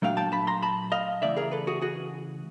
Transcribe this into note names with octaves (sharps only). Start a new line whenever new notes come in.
A#2 F#3 A3 D4 F5 G5
G5 A5
A5 B5
A#5 C6
A5 B5
D#5 F5
C#3 E3 A3 D5 E5
G#4 A#4
A4 B4
F#4 G#4
F#4 G#4